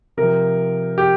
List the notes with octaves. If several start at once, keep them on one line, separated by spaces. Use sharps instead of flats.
C3 F3 A#4
G4